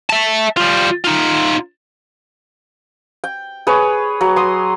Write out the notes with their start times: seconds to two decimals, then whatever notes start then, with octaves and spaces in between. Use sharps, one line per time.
0.10 E5 A5
0.57 G3 F4
1.05 D#4 F4
3.24 G5
3.67 G#4 B4 C#5
4.21 F#3
4.36 C6 D#6